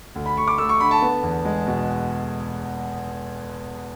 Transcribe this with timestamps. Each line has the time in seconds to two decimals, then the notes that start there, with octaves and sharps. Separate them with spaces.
0.15 D2
0.26 B5
0.36 D2 C#6
0.47 D6
0.58 A3 E6
0.69 C#6
0.80 D3 B5
0.91 A5
1.02 B3
1.23 E2
1.45 G#3
1.67 B2